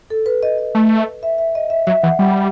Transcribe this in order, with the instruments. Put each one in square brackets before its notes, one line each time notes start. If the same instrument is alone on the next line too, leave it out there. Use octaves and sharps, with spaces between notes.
[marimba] A4
B4
D#5
D#5
[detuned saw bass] A3
[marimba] E5
E5
D#5
E5
[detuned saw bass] F#3 [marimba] E5
[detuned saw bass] E3 [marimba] F#5
[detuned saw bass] G3 [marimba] F#5